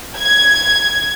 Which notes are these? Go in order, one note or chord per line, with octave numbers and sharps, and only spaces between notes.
G#6